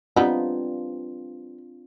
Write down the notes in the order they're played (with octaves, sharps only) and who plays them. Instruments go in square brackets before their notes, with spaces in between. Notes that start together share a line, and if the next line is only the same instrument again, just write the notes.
[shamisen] G3 B3 D#4 [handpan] C4 D4 F4